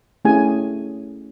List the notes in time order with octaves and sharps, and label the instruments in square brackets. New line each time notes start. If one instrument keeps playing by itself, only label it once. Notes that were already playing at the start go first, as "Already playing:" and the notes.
[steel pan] A3 C#4 E4 G4 G#4 G#5